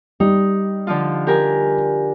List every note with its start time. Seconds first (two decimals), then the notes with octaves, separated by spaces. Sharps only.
0.20 G3 D#4
0.87 D3 F3 F4
1.27 G4 A#4 G#5